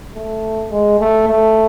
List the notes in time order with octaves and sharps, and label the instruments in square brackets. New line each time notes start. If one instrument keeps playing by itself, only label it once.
[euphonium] A3
G#3
A3
A3